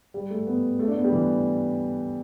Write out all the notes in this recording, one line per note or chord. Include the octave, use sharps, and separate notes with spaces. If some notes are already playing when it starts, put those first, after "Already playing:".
G3
A3
B3
A3
D4
B3
G3
E3